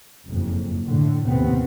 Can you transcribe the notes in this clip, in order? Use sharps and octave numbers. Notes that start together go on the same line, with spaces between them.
F#1 F2 G#2
A2 D3
A1 D#2 C3 B3 C4